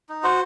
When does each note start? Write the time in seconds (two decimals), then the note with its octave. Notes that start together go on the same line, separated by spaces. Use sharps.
0.09 D#4
0.23 F#4 C5